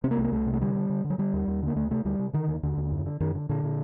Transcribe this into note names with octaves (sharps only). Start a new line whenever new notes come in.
C3 C4
A#3
C2 A3
A#3
C2 A3
C3
A3
D3 G3
D3
D3
D3
F#3
D3 G3
D#2
D#2
D3 A#3
D2 A3
C3 A3
D2 G3
C3
D3 D#3
D#2
D#2 D3
D#2
F#2
D3
F#2 D#3
D3
A#2 D3
A#2